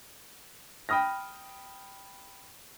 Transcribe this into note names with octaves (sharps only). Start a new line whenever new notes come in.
G5 B5 D#6 F6 A#6